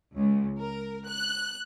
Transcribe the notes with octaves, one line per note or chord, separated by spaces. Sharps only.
C#2
A#4
F#6